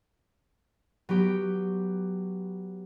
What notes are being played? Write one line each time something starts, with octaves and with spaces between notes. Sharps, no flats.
F#3 B3 G4